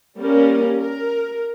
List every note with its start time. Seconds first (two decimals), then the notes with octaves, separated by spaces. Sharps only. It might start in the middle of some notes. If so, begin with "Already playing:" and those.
0.19 G3 A#3 C#4 A#4
0.80 A#4